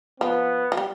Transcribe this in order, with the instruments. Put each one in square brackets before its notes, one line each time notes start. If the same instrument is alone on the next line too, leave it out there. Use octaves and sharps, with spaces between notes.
[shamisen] F3 [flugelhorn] B3
[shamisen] F3
G3